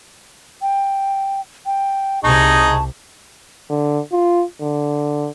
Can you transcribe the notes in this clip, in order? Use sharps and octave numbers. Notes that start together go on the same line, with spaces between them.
G5
G5
C2 C3 D#4 G#4 A5 C#6
D3
F4
D3